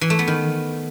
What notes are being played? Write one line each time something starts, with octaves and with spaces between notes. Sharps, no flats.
E3
A3
B3
D#3